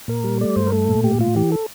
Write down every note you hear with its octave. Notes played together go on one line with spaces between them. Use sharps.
A#2 A#4
G3
A3 D5
G2 C5
A#4
A3 A4
A#2
A2 G4
A2 F4
E3 G4
A4